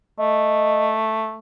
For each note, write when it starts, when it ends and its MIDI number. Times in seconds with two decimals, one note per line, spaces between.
0.19 1.39 57
0.19 0.95 75